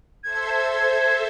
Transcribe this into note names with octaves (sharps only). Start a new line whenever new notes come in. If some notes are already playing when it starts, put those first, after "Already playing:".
A4 C5 E5 G#6